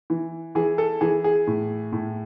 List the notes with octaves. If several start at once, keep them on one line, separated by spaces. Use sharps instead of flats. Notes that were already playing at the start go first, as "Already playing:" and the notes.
E3
E3 G#4
A4
E3 G#4
G#4
A2
A2